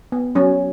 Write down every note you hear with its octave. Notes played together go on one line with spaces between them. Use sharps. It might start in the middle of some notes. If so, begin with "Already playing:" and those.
B3
F#3 C#4